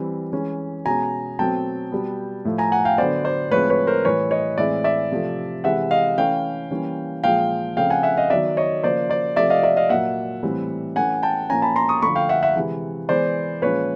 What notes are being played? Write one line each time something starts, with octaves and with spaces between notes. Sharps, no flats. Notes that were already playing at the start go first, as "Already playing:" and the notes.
Already playing: E3 G3 C4
E3 G#3 C#4
B2 G#3 C#4 G#5 A#5
B2 F#3 A3 C4 G5 A5
B2 G3 B3
A2 F3 A3
G#5 A#5
F#5 G#5
F5 G5
D3 F#3 B3 C5 D5
C5 D5
A2 F3 G#3 C4 B4 C#5
B4 C#5
A#4 C5
A2 E3 G3 B4 C#5
C#5 D#5
A2 E3 G#3 C4 D5 E5
D5 E5
C3 F3 A3
C3 E3 G#3 E5 F#5
D#5 F5
E3 A3 C#4 F5 G5
E3 G3 A#3 C#4
A#2 F3 G#3 F5 G5
C#3 F3 A3 C4 F5 G5
F#5 G#5
E5 F#5
D#5 F5
D#3 F#3 B3 D5 E5
C#5 D#5
C#3 F3 A#3 C5 D5
C5 D5
C3 F3 A3 C4 D5 E5
D#5 F5
D5 E5
D#5 F5
A#2 F#3 A#3 E5 F#5
A2 E3 G3 C4
E3 A3 C#4 F#5 G#5
G5 A5
A#2 F3 A#3 C#4 G#5 A#5
A5 B5
A#5 C6
C#6 D#6
D3 F3 A3 B5 C#6
F5 G5
E5 F#5
E5 F#5
C3 E3 G#3
E3 G#3 B3 C5 D5
A#2 F3 G#3 C#4 B4 C#5